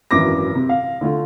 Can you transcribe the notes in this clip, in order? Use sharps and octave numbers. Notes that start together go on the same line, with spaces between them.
G#1 F#2 E3 D6 A#6
C3
F5
D3 A3 F4